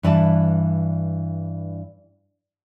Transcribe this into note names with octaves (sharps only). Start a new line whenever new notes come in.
G2 E3 D4 A5